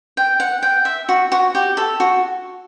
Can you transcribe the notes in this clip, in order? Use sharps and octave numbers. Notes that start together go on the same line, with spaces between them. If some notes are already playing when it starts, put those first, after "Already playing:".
G5
F#5
G5
E5
F#4
F#4
G4
A4
F#4